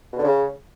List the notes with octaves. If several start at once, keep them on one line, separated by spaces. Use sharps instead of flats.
B2
D3
C#3